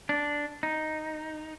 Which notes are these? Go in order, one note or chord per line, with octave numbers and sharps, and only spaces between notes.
D4
D#4